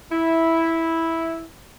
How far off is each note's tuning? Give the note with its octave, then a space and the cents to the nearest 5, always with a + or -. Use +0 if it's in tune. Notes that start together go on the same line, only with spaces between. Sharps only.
E4 -5